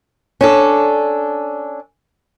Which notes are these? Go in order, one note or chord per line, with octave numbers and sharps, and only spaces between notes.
C#4 D4 A4